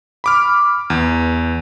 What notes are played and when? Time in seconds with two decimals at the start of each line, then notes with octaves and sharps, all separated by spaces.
0.24 B5 D6 F6
0.90 E2